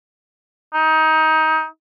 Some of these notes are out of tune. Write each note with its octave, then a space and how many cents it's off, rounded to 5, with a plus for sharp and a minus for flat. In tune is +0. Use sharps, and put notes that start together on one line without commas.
D#4 +20